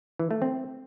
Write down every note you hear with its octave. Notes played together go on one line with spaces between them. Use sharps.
E3
A3
C4